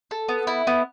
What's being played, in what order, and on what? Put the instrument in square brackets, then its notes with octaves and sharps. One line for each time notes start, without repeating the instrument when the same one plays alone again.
[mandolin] A4
B3
E4
B3